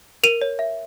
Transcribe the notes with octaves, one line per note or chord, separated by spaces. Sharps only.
A#4 D#7 F7
C#5
E5